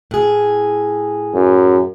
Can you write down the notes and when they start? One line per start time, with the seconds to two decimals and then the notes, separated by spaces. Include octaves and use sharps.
0.11 A2 G#4
1.34 F#2